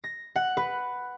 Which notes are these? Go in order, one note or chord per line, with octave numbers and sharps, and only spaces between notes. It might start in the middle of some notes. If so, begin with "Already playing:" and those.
A#6
F#5
B4